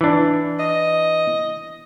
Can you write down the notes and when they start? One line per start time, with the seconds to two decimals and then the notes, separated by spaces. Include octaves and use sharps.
0.01 E3 D4
0.59 D#5